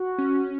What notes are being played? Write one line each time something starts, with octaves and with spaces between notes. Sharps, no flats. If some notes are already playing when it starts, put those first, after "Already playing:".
Already playing: F#4
C#4